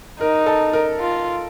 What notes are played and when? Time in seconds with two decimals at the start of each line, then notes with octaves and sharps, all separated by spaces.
0.21 D#4 A#4
0.46 A4
0.73 A#4
1.00 F4